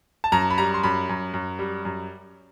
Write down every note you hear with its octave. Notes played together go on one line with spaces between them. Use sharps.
A5
F#2 A#5
B5
G3 A#5
C6
F#2 B5
F#2
F#2
G3
F#2